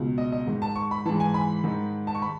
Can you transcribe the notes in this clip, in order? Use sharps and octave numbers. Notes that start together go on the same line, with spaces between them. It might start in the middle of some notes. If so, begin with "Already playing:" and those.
Already playing: C#2 B2
D#5
D#5
G#2 D#3
A5
C#6
B5
G#2 E3 A5
G#5
B5
G#2 D#3
A5
C#6
B5